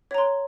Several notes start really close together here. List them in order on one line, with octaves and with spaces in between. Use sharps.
C#5 A#5 C6